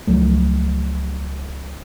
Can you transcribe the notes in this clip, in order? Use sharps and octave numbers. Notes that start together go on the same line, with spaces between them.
C#2 F3 F#3 A3